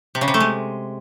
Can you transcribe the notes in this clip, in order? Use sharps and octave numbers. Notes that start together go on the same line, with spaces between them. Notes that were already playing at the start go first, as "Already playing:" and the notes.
C3
C#3
C3
A3
G#3